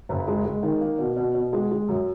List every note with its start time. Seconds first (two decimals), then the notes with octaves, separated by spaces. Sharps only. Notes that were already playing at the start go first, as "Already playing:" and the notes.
0.09 F#1
0.27 G#3
0.44 G#3
0.63 D#3
0.81 A#3
0.98 B2
1.16 B2
1.34 B2
1.53 G#3
1.71 G#3
1.88 F#2